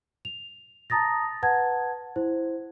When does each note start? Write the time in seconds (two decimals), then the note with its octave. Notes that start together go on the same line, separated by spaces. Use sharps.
0.25 F7
0.90 A5 A#5 D#6 A6 A#6
1.42 B4 F#5 A5 G#6
2.16 E4 C5